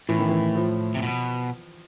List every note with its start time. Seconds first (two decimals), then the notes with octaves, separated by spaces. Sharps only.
0.09 A2 E3
0.19 D#3
0.29 E3
0.55 F3
0.95 C3
1.02 B2